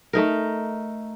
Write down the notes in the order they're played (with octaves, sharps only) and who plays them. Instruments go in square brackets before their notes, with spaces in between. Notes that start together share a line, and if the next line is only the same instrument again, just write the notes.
[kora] A3 D#4 A#4